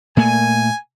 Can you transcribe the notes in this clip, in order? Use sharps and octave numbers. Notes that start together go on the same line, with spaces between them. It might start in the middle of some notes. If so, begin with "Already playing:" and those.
A#2 A3 A#3 G#5